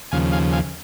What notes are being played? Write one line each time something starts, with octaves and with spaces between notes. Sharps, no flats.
D#2 C#3 F3 F5 G#5
F5 G#5
F5 G#5